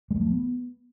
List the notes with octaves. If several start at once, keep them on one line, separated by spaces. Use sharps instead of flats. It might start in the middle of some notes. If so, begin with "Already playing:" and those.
G#3
F#3
A3
F3
B3